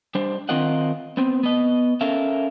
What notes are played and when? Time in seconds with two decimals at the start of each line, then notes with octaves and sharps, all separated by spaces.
0.15 G3 D4 C5
0.49 D#3 C4 F4 A#4 D#5 F#5
1.17 B3 C4
1.43 B3 D#5
2.01 C#4 A4 A#4 E5 F5